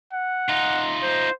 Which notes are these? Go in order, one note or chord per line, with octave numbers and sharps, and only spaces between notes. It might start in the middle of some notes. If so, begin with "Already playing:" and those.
F#5
D#4 F4
C5